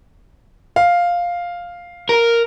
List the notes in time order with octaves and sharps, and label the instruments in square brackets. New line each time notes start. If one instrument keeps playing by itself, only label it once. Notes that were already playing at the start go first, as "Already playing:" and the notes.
[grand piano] F5
[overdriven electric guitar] A#4